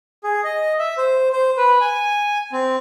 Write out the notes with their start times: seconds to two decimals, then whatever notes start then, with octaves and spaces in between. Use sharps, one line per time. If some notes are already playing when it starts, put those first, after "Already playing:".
0.24 G#4
0.44 D#5
0.79 E5
0.97 C5
1.32 C5
1.57 B4
1.81 G#5
2.52 C4